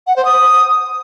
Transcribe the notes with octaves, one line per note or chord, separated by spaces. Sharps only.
F#5
C5
D#6